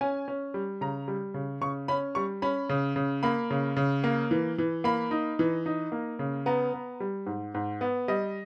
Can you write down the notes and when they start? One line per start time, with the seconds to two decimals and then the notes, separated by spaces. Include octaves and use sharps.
0.01 C#4 G#5
0.28 C#4
0.54 G3
0.81 C#3 A#5
1.08 G3
1.34 C#3
1.61 C#3 C#6
1.88 C#4 B5
2.15 G3 C#6
2.42 C#4 B5
2.69 C#3
2.96 C#3
3.23 A#3 B5
3.50 C#3
3.76 C#3
4.04 A#3
4.31 E3
4.58 E3
4.84 A#3 B5
5.11 D#4
5.39 E3
5.66 D#4
5.92 A#3
6.19 C#3
6.46 B3 A#5
6.74 B3
7.00 G3
7.26 G#2
7.54 G#2
7.81 B3
8.08 G3 D#5